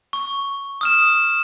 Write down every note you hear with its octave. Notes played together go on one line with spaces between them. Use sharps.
C#6
D#6 F6 E7